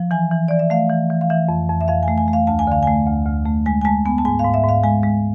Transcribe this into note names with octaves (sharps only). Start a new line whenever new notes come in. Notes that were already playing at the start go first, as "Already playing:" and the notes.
Already playing: F3
E3 G#5
E3
E3 D5
E5
A3 F5
E3
E3
F5
E3 E5
F2
F2
E5
F2 F5
G#5
A3
G#5
A3
F5
D2 A5
G#5
D3 F5
A3 G#5
D2
D2
A3
G#3 G#5
G#5
G#3 A5
B3 G#5
A5
G#2 G#5
F5
G#2
E5
G#2 F5
G#3 G#5
G#3